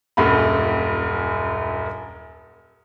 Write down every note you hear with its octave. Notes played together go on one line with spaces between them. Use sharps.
D#1 A#1 F#2 B5